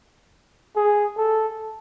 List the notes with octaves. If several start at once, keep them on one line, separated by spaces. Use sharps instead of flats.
G#4
A4